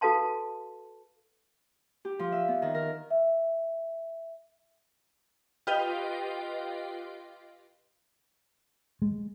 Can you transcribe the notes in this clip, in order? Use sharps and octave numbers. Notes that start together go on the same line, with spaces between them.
F#4 A4 B4 F5 A5 C6
G4
F3
E5
B3
D#3
A#4
E5
F4 G4 B4 D#5 F5 G5
G#3